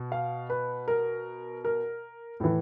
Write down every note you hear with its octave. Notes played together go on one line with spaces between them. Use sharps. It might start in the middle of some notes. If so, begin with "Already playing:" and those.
Already playing: B2
F5
B4
A#4
A#4
A2 E3 A4